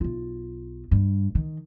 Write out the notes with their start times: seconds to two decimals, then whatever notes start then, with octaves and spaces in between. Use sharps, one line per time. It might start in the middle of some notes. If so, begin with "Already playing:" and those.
0.01 B1 F4
0.91 G2
1.35 D#3